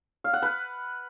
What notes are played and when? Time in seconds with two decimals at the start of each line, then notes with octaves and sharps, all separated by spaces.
0.24 F5
0.33 F#5
0.42 B4